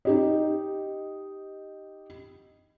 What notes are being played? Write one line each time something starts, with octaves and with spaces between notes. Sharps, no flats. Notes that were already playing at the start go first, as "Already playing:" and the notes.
D#4 G4 D#5